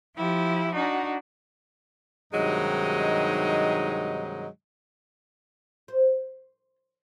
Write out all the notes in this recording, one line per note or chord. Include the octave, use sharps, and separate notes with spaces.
F3 E4 G4
D4 D#4 F#4
G2 C3 D#3 F#3 G#3 D#4
C5